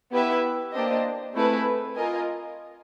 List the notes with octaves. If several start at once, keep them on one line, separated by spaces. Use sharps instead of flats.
B3 E4 G4 B4 E5
A#3 D4 G4 C5 D#5
A3 C4 E4 G#4 B4
F4 A#4 D#5 G#5